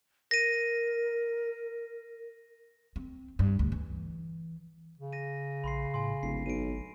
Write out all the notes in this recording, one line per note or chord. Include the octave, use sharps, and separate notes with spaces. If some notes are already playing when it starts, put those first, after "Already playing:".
A#4 A#6 D#7
C4
G2
D2
E3
C#3
A#6 D#7
A#1 B5 C6 C7
A2 G#5 C6
D1 G#1 C7
B1 D7 D#7